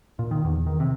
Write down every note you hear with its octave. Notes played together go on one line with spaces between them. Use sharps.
A#2
D#3
E2
D#3
C3